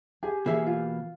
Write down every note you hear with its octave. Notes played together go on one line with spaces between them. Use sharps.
G4 G#4 G#5
B2 E3 A#3 G#4 E5
F4